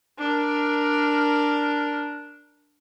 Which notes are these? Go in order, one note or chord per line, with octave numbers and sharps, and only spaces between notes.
D4 A#4